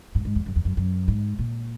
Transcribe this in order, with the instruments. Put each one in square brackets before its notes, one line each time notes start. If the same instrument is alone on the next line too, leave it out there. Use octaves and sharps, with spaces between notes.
[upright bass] G#2
G#2
E2
F#2
E2
F#2
F#2
G#2
A#2